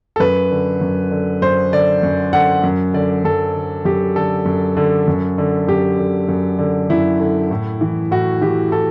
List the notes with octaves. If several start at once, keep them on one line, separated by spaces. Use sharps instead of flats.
A4
F#2 B4
D3
F#2
D3
F#2 C5
D3 D5
F#2
D3 F#5
F#2
D3 D5
F#2 A4
D3
F#2 G4
D3 A4
F#2
D3
F#2
D3
F#2 G4
D3
F#2
D3
F#2 E4
D3
A2
E3
A2 F#4
E3 G4
A2 A4